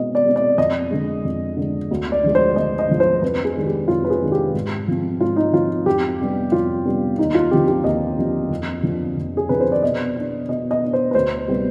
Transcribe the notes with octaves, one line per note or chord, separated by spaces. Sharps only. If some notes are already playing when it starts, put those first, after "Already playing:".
Already playing: B2 G#3 C4 D#5
D5
G#3 C4
D5
F2 D#5
D3 G#3
F2
D3 G#3
D2
D5
D3 F3 G#3
C5
D2 D#5
D#5
D3 F3 G#3
C5
F2 B4
G#4
C3 D#3 G#3 D4
G4
F2 F4
B4
G#4
C3 D#3 G#3 D4
G4
G#2
F3 C4
G#2 F4
D#4
F3 C4 F4
F2 G4
C3 G3 B3 D4
F2 F4
C3 G3 B3 D4
D#2 D#4
F4
D3 F3 C4 G4
G4
D#2 D#5
D3 F3 C4
F2
D3 F3 C4
F2
G#4
D3 F3 C4 B4
C5
D5
B2 D#5
B3 D4
B2 D#5
D#5
B3 D4
C5
B4
D2 C5
C3 G3 B3